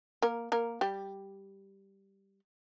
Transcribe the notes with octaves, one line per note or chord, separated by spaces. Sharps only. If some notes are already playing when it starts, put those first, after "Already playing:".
A#3 A#4
A#3 A#4
G3 G4